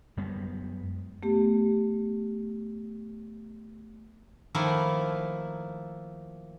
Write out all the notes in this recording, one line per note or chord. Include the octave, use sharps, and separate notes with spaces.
F#2 G3 G#3 B3
A3 B3 G4
D#3 F3 A3 A#3 E4